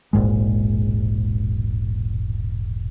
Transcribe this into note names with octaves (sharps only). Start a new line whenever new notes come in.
E1 A#1 G#2 G#3